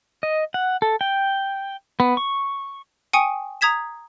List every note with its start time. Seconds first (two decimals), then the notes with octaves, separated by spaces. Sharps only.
0.23 D#5
0.54 F#5
0.82 A4
1.01 G5
2.00 B3
2.17 C#6
3.13 G5 G#5 C#6 D#6 C#7 D#7
3.61 A#5 D#6 G#6 B6 E7